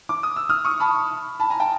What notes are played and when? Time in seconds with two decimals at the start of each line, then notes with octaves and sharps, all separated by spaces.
0.09 D6
0.23 D#6
0.36 E6
0.49 D#6 F6
0.65 C#6 D#6
0.80 A5 B5
1.40 A5 B5
1.50 G#5 A#5
1.60 G5 A5